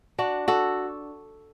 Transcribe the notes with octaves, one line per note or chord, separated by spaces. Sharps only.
D4 F#4
F#4 A4